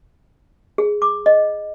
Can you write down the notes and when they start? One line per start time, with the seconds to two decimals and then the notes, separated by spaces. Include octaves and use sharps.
0.78 G#4
1.02 D6
1.26 D#5